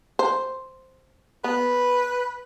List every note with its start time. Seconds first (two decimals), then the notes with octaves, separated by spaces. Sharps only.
0.19 C5
1.44 B3 B4